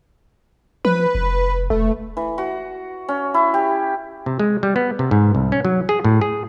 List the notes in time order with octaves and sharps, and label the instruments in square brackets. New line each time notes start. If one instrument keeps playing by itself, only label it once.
[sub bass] F3 [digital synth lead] B4
[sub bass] F1
[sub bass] E1 [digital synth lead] A3
[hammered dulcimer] E3
F#4
C#4
E4
G4
[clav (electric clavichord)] C3
G#3
G3
B3
C3
G#2
C2
C#4
F#3
G#4
A2
G#4